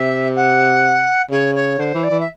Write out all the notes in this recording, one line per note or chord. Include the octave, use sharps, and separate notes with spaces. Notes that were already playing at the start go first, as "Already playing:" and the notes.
Already playing: C3 E5
F#5
C#3 C#5
C#5
D3 C5
E3
D5
E3
E5